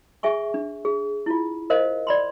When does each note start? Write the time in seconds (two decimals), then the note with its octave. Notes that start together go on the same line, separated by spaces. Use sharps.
0.23 G#4 E5 G#5 C#6
0.54 D4
0.85 G#4
1.26 E4 F4
1.70 A#4 C5 D#5 F5
2.07 D5 B5 C6